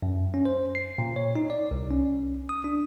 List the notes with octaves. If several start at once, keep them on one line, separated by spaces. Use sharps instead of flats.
F#2
C#4
C5
C7
A#2
C#5
D#4
D5
C2
C#4
D#6
D4